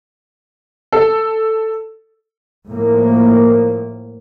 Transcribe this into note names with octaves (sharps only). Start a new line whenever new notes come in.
A4
A2 F3 A#3